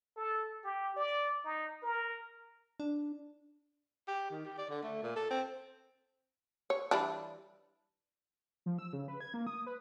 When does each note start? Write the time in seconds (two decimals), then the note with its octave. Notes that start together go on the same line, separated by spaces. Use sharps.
0.17 A4
0.64 G4
0.96 D5
1.45 D#4
1.83 A#4
2.80 D4
4.08 G4
4.30 D#3
4.45 G4
4.58 D5
4.70 D3
4.83 A3
5.03 A#2
5.16 A4
5.30 C4
6.70 C#5
6.91 E3 G3 D4
8.66 F3
8.79 E6
8.93 C#3
9.08 B4
9.21 G#6
9.34 A#3
9.47 D#6
9.67 B4